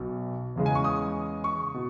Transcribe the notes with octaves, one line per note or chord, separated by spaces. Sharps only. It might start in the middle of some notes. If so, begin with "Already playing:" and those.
Already playing: B1 B2 F#3
E2 C#3 G#3
G#5
C#6
D#6
C#6
B2